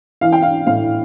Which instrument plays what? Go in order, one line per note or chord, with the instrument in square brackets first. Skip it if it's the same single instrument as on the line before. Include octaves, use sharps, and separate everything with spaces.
[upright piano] E3 F5
G5
F5
A2 F5